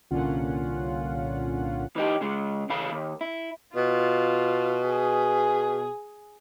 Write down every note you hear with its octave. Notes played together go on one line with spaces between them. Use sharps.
C2 A#2 D3 C#4 F4 F#5
E3 D#4 G4
C#3 G#3
C#3 E3 F5 B5
D#2
E4
B2 F4
G#4